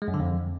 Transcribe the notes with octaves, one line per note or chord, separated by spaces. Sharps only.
G#3
F#2
D3
F2